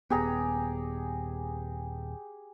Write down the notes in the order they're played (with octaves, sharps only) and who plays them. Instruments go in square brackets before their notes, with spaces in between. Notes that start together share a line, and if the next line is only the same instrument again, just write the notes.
[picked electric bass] D#1 B3 [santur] G4 G#4 A#5